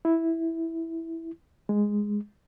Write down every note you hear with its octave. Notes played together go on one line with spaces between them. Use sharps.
E4
G#3